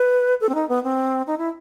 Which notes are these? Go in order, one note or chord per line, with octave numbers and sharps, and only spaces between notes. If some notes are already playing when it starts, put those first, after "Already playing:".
Already playing: B4
A4
C4
D#4
B3
C4
D#4
E4